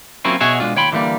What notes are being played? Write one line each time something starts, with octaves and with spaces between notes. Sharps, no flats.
F#3 A#3 C4 C#4 E4 F4
B2 F#4 G#4 C#5 E5
B2 G#3 D4 F4
D#2 C#5 G5 B5 C6
D3 E3 F#3 G3 A#3